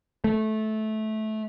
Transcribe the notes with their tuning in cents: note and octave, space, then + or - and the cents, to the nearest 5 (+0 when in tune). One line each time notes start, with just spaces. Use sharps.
A3 -15